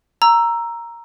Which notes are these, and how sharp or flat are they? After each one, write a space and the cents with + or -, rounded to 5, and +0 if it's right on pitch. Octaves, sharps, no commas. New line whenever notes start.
A#5 +0 E6 +10